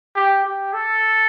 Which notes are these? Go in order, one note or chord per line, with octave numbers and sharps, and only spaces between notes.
G4
G4
A4